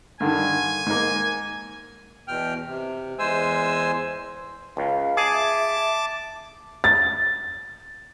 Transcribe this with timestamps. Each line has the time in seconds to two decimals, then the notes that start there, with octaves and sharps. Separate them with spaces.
0.20 G2 D3 D#3 G#5
0.86 G#2 A#3
2.28 E2 B2 G5 F6
2.68 C3
3.19 E2 G#3 C5 G#5 E6
4.77 C#2 F5
5.17 G#4 A5 D6
5.33 E5
6.84 A6